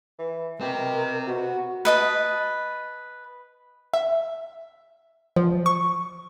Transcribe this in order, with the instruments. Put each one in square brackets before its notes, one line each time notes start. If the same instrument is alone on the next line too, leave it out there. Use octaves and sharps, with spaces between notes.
[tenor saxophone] E3
[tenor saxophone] B2 [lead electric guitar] C4 G4 [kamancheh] A#4
[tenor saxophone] B2 [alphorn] F#4
[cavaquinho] B4 D#5 A5
[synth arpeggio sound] E5
F3
C#6